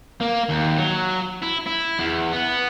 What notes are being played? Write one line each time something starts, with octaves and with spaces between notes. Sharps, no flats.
A#3
D#2
F#3
E4
E4
E2
B3